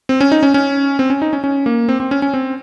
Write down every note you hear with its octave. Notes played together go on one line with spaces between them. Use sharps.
C4
C#4
D#4
C#4
C#4
C4
C#4
D#4
C#4
C#4
A#3
C4
C4
C#4
C#4
C4